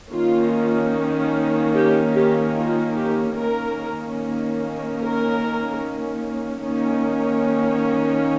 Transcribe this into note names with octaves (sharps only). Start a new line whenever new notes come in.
D#3 A#3 C#4 F4
G4
G4
F4
G4
D#3 A#3 C#4 A#4
A#4
D#3 A#3 C#4